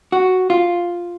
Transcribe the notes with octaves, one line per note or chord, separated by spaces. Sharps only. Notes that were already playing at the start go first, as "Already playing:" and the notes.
F#4
F4